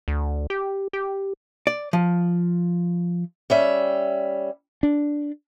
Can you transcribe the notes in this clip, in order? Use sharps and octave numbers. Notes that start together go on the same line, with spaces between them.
D2
G4
G4
D5
F3
G3 C#4 E5
D4